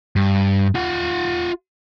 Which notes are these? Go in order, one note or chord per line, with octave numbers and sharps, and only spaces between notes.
G2
F4 F#5